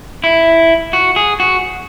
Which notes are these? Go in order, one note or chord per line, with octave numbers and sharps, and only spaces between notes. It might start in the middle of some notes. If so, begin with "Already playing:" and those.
E4
F#4
G#4
F#4